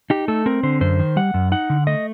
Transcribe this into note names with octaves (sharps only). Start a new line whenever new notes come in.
D#4 G4
A3 A4
C4 A#4
D3 C5
F#2 C5
D#3
G3 F#5
F#2
D#4 F#5
D3
A3 D#5